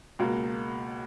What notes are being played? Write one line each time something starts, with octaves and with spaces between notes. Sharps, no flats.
C#2 B2 A#3